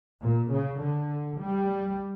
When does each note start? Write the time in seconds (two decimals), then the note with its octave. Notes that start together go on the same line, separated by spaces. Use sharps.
0.22 A#2
0.51 C#3
0.81 D3
1.40 G3